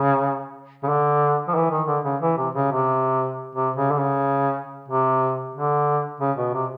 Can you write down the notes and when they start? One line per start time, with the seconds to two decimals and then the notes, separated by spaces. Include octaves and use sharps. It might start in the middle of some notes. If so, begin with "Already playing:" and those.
Already playing: C#3
0.83 C#3
0.88 D3
1.48 F3
1.55 E3
1.70 D#3
1.87 D3
2.04 C#3
2.21 E3
2.37 C3
2.55 C#3
2.71 C3
3.55 C3
3.76 C#3
3.91 D3
3.99 C#3
4.88 C3
5.55 D3
6.20 C#3
6.37 B2
6.54 C3